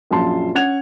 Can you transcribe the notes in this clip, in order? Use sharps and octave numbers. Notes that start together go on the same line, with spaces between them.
A#1 F#2 F4 A5 C6
C#4 F#5 G#6 F7